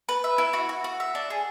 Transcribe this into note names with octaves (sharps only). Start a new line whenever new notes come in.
B4
E5
E4
F#4
F#4
F#4
E5
D4
G#4